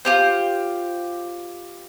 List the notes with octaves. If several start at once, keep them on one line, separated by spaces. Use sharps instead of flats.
F4 G4 C5